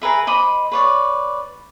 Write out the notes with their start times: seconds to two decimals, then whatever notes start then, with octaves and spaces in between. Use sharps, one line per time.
0.02 G#4 A#4 B4 E5
0.27 C5 D#5 B5 D6
0.72 B4 C#5 D5